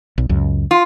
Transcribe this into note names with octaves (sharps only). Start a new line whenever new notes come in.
B1
C#2 F#2
F4